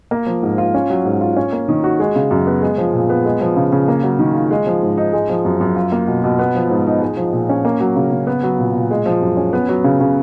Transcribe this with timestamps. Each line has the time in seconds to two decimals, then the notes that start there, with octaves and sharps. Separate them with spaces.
0.11 A#3
0.27 F3
0.43 G#2
0.58 F4
0.74 C#4
0.90 F#3
1.05 G#2
1.21 F4
1.37 C#4
1.52 A#3
1.68 D#3
1.84 F#4
2.00 G#3
2.15 C#3
2.31 F#2
2.47 B3
2.62 G#3
2.78 F3
2.93 A#2
3.09 B3
3.25 G#3
3.41 F3
3.56 C#3
3.72 C#3
3.88 A#3
4.03 F#3
4.19 D#3
4.35 F4
4.51 G#3
4.67 F3
4.83 G#2
4.97 D#4
5.13 G#3
5.29 F3
5.45 F#2
5.61 F#2
5.76 F4
5.92 A#3
6.07 B2
6.24 B2
6.39 B3
6.55 F3
6.70 G#2
6.86 D#4
7.02 G#3
7.17 F3
7.33 A#2
7.49 C#4
7.65 A#3
7.80 F#3
7.96 C#3
8.11 C#3
8.27 B3
8.43 F#3
8.59 A#2
8.75 A#2
8.91 G#3
9.06 F3
9.22 F#2
9.37 C#4
9.53 B3
9.69 F#3
9.84 C#3
10.00 C#3